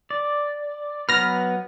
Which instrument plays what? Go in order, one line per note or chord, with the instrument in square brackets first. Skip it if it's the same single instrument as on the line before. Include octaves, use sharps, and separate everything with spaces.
[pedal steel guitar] D5
[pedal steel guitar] F#3 B3 B4 [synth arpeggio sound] F6 A#6